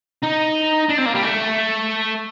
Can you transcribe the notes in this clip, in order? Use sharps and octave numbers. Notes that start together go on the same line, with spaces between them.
D#4
D4
C4
A#3
G3
A3